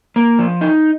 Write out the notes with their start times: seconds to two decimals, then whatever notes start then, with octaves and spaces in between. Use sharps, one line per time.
0.16 A#3
0.39 F3
0.61 D#4